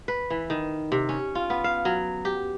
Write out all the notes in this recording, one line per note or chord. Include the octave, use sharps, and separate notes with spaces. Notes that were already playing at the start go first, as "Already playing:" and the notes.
B4
E3
D#3
C3
C#4
F4
B3
F5
F#3
G4